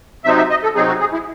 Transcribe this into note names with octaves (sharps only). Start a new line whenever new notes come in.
C3 F#3 C4 D#4 E5
E5
D#5
A4
C3 F#3 C4 D#4 G#4
F#4
G#4
E4